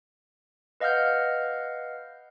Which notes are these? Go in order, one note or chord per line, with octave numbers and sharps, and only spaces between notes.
B4 D#5 F5 F#5 F6 G6